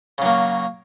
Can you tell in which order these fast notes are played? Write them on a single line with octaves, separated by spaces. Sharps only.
C#3 F#3 A#3